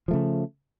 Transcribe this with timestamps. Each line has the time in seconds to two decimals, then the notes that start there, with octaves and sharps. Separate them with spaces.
0.08 F3
0.11 A3
0.13 C#3